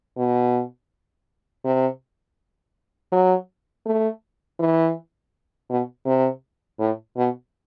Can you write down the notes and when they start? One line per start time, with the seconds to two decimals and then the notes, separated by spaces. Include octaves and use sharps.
0.18 B2
1.65 C3
3.12 F#3
3.86 A3
4.59 E3
5.70 B2
6.06 C3
6.79 A2
7.17 B2